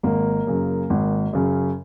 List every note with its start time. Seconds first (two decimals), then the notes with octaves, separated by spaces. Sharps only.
0.03 G#1 A#3
0.47 F#2 C#3
0.90 G#1
1.33 F#2 C#3